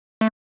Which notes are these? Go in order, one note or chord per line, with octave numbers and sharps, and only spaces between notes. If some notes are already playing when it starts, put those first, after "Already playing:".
A3